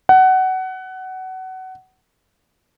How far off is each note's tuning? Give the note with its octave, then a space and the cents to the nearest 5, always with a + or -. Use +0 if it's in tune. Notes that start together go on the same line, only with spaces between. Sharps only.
F#5 +20